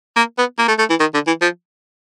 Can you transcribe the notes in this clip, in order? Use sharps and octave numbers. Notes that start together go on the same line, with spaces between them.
A#3
B3
A#3
A3
A3
E3
D#3
D3
E3
F3